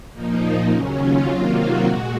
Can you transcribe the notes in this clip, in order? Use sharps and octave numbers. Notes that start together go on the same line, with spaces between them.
A#2 F3 A#3 D#4
D#2 C#3 F#3 C#4
F4
C3 D#3 F#3 A#3
F#4
A#2 G#3